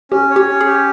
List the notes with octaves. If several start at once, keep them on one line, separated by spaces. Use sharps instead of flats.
C#4 G4
C#5
G4
C#4
G#4
G4